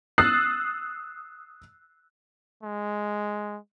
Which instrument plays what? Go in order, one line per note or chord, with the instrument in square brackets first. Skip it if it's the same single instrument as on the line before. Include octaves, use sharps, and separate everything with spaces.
[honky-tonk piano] D#6 E6 F#6 A6 C7
[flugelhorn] G#3